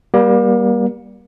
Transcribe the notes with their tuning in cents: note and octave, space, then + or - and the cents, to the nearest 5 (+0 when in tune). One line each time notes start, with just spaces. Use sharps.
G3 +0 A#3 +35